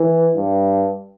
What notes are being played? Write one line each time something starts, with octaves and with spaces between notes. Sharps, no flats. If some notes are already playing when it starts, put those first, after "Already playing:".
Already playing: E3
G2